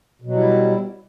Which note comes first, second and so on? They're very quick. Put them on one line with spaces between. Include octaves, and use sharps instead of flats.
B2 F#3 G3 E4